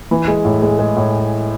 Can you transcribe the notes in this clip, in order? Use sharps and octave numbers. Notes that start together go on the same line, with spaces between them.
E3
G#3
A2
G#3
G#3
A2